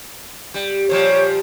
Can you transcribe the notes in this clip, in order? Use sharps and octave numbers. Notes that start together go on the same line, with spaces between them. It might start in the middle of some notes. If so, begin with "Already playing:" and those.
G3
A#2 F3 G3 C#5